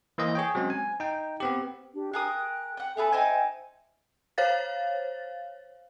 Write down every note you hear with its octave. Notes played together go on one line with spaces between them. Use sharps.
E3 A#3 C5 D#5
G#4 C#5 G5
F#3 G#3 C4 C#4
G#5
D#4 G5
B3 C4 G4
D4 G4
G#4 A#4 G5 D#6 F#6
F#5 G5
B3 G#4 A4 B4 E5 G#5
D#4 C5 E5 G5 G#5
C5 C#5 F5 A6